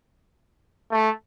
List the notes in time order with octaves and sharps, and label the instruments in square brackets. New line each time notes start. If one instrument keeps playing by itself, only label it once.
[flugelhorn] A3